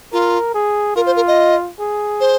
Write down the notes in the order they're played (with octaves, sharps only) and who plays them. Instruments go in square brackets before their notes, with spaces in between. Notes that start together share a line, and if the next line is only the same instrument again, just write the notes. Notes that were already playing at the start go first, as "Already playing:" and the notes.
[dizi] F4 [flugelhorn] A#4
[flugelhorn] G#4
[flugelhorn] F4 [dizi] A#4
[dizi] C5
A#4
D#5
[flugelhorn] G#4
[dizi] C5